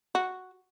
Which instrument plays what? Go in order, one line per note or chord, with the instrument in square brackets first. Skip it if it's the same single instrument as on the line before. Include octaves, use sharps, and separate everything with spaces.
[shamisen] F#4